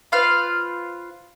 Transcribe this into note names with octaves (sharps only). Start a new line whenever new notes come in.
F4 B4 C5 F5